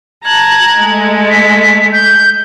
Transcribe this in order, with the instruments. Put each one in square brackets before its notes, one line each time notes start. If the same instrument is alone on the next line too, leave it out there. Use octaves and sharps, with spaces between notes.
[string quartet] A5 A#5 F#6 [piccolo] G#6
[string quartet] G#3 A3
[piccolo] B6
G6